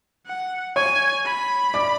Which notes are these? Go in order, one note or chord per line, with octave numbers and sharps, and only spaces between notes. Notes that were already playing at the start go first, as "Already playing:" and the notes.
F#5
C#5 G#5 C#6
B5
D5 D6